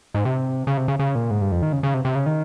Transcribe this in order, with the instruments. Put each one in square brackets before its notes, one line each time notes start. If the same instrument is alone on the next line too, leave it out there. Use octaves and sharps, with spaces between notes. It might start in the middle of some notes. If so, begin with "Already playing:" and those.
[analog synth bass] G#2
C3
C#3
C3
C#3
C#3
A#2
G#2
G2
F2
D#3
C#3
C#3
C3
C3
C#3
D#3